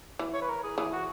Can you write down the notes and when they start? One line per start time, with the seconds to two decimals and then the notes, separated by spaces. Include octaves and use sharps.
0.19 E3
0.34 C#5
0.42 B4
0.49 A#4
0.63 G#4
0.77 E3 G#4
0.92 F#4